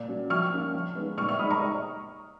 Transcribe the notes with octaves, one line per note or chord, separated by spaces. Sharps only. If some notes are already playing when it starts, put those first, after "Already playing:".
Already playing: A#2
F#3 C#4
F3 C#6 F6
A#3 C#4
F3
G#3 B3 D#4
A#2 C#6 F6
C#6 F6
G#3 D#4 B5 D#6
A#5 C#6